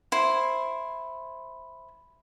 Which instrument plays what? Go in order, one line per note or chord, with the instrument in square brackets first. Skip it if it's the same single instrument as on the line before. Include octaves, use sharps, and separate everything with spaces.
[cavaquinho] E4 C5